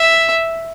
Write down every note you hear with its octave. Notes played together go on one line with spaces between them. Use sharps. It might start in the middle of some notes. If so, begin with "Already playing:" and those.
Already playing: E5